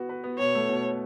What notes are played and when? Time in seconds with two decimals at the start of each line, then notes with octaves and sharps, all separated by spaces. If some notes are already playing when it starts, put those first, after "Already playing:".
Already playing: B3 F#4
0.09 B4
0.24 B3
0.38 B2 C#5
0.55 A3
0.69 B2